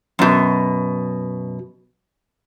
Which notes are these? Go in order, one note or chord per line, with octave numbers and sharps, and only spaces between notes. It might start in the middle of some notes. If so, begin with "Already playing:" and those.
F#2 B2